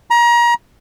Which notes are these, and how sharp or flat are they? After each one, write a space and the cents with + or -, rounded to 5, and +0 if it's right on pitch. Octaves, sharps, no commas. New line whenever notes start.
A#5 +30